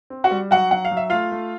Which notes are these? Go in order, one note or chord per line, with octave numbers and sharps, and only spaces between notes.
C4
F#4 F#5
G3
F#3 F#4 F#5
F#3 F#5
F5
F#3
E5
A3 F4 F5
A3